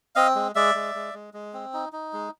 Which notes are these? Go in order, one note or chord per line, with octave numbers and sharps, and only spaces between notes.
C4 D#5 F5
G#3
G#3 D5 E5
G#3
G#3
G#3
G#3
C4
D#4
D#4
G#3